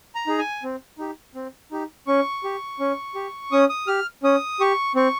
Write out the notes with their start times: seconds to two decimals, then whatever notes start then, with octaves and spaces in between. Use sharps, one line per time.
0.15 A#5
0.27 D#4 G#4
0.38 G#5
0.63 C4
0.98 D#4 G4
1.35 C4
1.71 D#4 G4
2.07 C#4 C#6
2.44 G4
2.80 C#4
3.15 G4
3.52 C#4 D#6
3.69 D#6
3.87 G4 F6
4.23 C#4 D#6
4.60 G4 C#6
4.95 C4 C#6